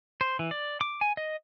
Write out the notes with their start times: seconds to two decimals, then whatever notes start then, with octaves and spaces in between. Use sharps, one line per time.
0.21 C5
0.39 E3
0.51 D5
0.81 D6
1.01 G#5
1.17 D#5